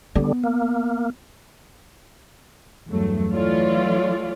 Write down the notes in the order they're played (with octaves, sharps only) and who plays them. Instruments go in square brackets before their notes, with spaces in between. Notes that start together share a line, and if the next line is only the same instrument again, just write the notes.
[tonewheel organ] D3 G3 [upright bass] B3
[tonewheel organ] A#3
[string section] E2 G2 F#3 A3
E3 F#3 A3 F4 C#5 D5